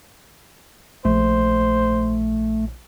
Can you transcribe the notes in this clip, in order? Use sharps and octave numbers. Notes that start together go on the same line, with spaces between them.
A#1 A3 C5